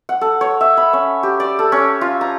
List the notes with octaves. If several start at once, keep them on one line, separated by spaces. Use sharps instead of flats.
F#5
A4
C#5
E5
B5
C#4
G4
D5
A4
C#4
F4
A#5